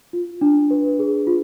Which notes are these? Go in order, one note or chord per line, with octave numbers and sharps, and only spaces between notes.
F4
D4
B4
G#4
F4